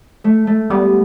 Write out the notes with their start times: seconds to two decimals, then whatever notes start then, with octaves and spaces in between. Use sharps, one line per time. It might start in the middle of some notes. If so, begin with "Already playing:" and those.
0.24 A3
0.47 A3
0.70 G3 B3